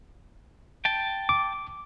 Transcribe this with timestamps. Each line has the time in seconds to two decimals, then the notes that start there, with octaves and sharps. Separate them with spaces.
0.85 G5 A5
1.29 D6